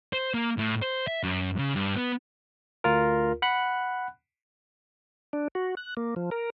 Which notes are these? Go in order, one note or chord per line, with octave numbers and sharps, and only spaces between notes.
C5
A#3
A2
C5
E5
F#2
C#3
G2
B3
D2 F4 A#4
F#5 B5 F#6
D4
F#4
F#6
A#3
F3
A#4